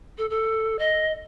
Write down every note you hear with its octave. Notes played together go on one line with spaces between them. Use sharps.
A4
A4
D#5